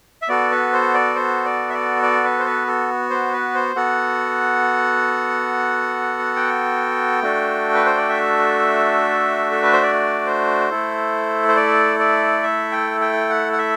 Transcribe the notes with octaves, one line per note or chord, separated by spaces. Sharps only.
E5
B3 F#4 A4 D5
B4
C5
D5
C5
D5
E5
D5
D5
B4
C5
B4
A4
C5
B4
C5
B3 F#4 A4 F#5
G5
A3 D4 F#4 A4
B4
C5
D5
E5
A4
B4
C5
D5
C5
A3 E4 A4
C5
D5
D5
E5
G5
G5
F#5
F#5
E5